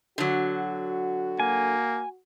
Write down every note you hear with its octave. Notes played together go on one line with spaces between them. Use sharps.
D3 F#3 F#4
A#3 G#5